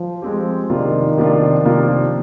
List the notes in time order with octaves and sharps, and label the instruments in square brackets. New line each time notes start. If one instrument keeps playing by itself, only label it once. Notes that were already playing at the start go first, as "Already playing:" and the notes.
Already playing: [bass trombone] F3
[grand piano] G#3 C4 G4
[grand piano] C3 F3 A#3 D4 F4 [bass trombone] D#3
[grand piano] C3 F3 A#3 D4 F4
C3 F3 A#3 D4 F4